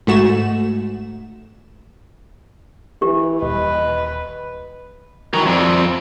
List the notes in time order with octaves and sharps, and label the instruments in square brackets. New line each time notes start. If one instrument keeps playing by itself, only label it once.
[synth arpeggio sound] G#2 A3 F#4 E7
[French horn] E3 [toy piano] G4
[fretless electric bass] D#1 [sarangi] B4 [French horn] D#5
[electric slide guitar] D#3 E3 [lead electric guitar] F#4 A#5
[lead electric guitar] F2 [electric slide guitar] C4 D5